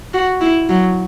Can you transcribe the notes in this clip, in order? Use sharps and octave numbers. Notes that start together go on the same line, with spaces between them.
F#4
E4
F#3